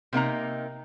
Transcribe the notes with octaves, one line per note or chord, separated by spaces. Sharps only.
C3 A#3 D#4 A#5